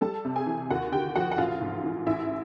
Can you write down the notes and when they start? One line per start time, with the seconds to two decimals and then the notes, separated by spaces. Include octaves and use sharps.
0.01 G3 A4 A5
0.25 C3
0.36 G#4 G#5
0.46 E3
0.70 D#2 F#4 F#5
0.92 D3 G4 G5
1.15 F3 F#4 F#5
1.32 F#5
1.38 A1 F4 F5
1.61 G#2
1.84 E3
2.06 A1 E4 E5